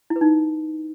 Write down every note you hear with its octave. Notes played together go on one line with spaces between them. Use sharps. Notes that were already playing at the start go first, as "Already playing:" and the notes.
E4
B4
D#4